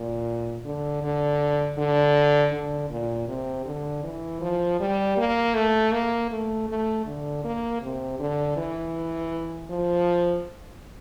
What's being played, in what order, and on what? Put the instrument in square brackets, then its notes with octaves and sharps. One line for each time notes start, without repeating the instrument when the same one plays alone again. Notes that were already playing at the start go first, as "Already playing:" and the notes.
Already playing: [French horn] A#2
D3
D3
D3
D3
A#2
C3
D3
E3
F3
G3
A#3
A3
A#3
A3
A3
D3
A#3
C3
D3
E3
F3